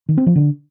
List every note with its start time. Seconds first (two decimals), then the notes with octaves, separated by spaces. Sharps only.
0.09 D#3
0.18 C4
0.26 F3
0.35 D3